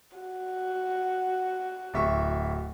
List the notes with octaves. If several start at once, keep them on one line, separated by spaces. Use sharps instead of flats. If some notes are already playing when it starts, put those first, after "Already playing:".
F#4
D1 E5 C#6